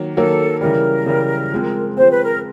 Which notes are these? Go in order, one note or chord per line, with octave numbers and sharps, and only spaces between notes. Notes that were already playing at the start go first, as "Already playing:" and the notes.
Already playing: D#3 F#3 A#3
D#3 F#3 A#3 A4
C#3 E3 G3 A#4
C#3 E3 G3
F3 G#3 C4
F3 G#3 C4 C5
B4
A#4